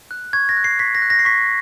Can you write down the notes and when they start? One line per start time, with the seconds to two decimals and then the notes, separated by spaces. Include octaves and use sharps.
0.11 F#6
0.33 C#6 G#6
0.49 A#6
0.57 F#6
0.64 C7
0.79 C#6 B6
0.95 A#6
1.02 F#6
1.10 A#6
1.19 C7
1.25 C#6 B6